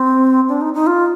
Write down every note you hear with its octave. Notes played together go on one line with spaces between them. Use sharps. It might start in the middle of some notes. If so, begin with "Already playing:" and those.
Already playing: C4
D4
D#4
D#4
F4